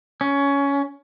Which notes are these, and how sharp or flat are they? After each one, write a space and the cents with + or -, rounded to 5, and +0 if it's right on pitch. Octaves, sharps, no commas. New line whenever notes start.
C#4 +15